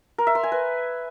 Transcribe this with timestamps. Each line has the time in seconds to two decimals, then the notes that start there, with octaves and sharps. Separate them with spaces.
0.18 A#4
0.27 E5
0.35 C6
0.43 G#5
0.52 B4